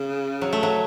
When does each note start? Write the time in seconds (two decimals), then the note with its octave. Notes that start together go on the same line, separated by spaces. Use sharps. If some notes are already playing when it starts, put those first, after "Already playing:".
Already playing: C#3
0.41 F#3
0.53 A3
0.63 F#3